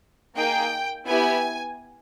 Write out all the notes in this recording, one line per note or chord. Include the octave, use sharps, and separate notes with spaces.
A#3 D#4 G#4 G5
B3 E4 G4 G#5